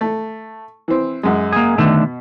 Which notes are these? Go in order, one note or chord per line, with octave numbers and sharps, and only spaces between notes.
A3
E3 C4
F#2 G#3
A#3 G#4
B2 D3 D#3 A3